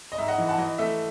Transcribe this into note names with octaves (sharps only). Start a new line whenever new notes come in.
D#5
G#2 E5
D#5 F#5
E3
F#5 A5
E3 D#5
A3 E5